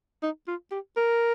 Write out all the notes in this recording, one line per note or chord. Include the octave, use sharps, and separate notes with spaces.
D#4
F4
G4
A#4